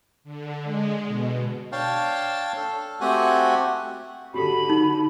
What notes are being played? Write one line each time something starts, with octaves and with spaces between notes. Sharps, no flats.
D3
G#3
B2
D4 C#5 F5 G5 A5
A4
A3 C4 F#4 G4 F#5 G#5
D3 F#4 G4 A4 B5
D#4